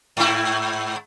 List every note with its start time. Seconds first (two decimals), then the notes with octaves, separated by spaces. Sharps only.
0.17 G#2 E4